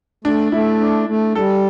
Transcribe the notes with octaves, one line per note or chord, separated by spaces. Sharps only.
A3 D4
A3 E4
D4
A3
G3 A4